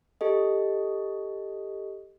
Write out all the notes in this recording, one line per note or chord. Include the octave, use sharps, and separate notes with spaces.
G4 A4 D#5